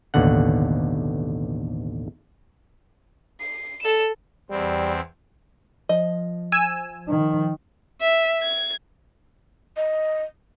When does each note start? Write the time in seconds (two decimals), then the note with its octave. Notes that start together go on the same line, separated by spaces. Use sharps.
0.14 A1 D#2 B2 D3 F#5
3.40 C7
3.81 A4 E7
4.50 E2 G3 C4
5.89 F3 D#5
6.52 G#5 E6
7.09 D#3
8.01 E5
8.42 G#6
9.77 D#5